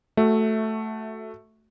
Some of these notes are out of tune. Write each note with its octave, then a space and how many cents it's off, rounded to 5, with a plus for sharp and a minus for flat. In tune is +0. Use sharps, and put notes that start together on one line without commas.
A3 +0 F#4 +0 E5 -10